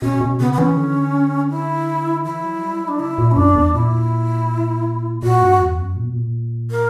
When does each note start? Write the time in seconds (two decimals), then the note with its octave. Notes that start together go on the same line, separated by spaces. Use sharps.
0.01 B2 C#4
0.21 B2
0.40 C#3 B3
0.53 B3
0.58 E3 C#4
0.77 D3
1.50 E4
2.24 E3 E4
2.44 F#3
2.62 G3
2.81 F#3
2.88 D4
3.00 C#3 E4
3.18 A#2
3.31 C#4
3.36 F#2 D4
3.55 E2
3.74 A#2 E4
5.23 A#2 F#4
5.41 G2
5.60 E2
5.79 F#2
5.97 A#2
6.04 B2
6.13 A#2
6.71 A#4